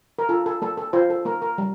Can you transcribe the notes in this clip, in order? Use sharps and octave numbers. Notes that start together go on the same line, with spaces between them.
A#4
F4 A4
A4
A#3 A4
A4
F4 C5
A4
A#3 A#4
A#4
G3